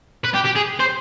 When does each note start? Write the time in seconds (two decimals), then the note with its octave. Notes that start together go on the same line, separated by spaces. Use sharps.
0.25 B4
0.35 G4
0.45 G4
0.56 G#4
0.80 C5